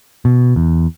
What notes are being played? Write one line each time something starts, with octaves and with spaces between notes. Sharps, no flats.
B2
E2